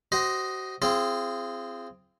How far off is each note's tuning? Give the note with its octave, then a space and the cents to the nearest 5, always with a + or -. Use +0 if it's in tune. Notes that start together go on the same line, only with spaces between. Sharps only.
F#4 +35 C5 -5 D#5 +0
C4 +0 F4 -35 G#4 +0